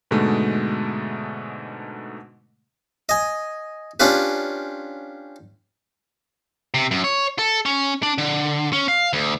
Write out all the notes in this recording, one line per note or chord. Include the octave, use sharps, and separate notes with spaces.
G#2 B2 D3 G#3 A3
D#5 G#5
C#4 D4 F4 G4 B4
C3
F#2
C#5
A4
C#4
D4
D3
C#4
F5
D2